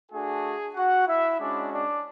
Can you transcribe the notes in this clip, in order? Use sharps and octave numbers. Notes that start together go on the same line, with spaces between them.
A3 D4 F#4 G#4 G#5
F#4 F#5
E4 E5
G#3 C#4 D4 F#4 D5
D4 D5